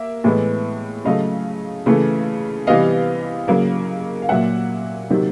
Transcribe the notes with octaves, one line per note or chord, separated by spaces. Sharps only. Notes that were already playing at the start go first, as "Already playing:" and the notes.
Already playing: A#3 E5
A2 E3 G#3 B3
C#3 F#3 A3 D#5 F5
C#3 E3 A3
C3 E3 G3 B3 D#5 F5
C#3 F#3 A#3
F5
A#2 F#3 A#3 E5 F#5
C3 D#3 F#3 A#3